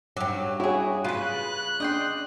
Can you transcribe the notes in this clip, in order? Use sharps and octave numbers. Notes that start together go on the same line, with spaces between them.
G2 F#3 G5 D6
E4 F#4 G#4 C#5 G5
C#3 F4 B4 F#6 D#7
D4 D#5 G5 C6